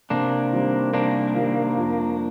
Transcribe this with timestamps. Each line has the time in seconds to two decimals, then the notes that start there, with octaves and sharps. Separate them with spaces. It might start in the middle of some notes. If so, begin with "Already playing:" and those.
0.10 C3 A#3 D4
0.52 D#3 G3 C4
0.94 C3 A#3 D4
1.35 D#3 G3 C4
1.77 F2